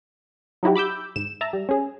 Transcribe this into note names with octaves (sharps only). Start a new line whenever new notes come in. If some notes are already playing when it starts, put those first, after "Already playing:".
F#3 D#4 E4 F#4 G4
B5 D6 E6 G6
G#2 E7
E5 A5 A#5
G3
C#4 G#4